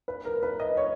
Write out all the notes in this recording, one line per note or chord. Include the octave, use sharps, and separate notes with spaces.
B4
A#4
B4
D#5
C#5